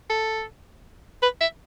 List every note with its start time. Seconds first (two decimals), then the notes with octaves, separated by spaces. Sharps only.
0.10 A4
1.22 B4
1.41 E5